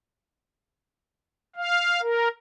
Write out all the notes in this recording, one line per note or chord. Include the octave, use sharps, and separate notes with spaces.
F5
A#4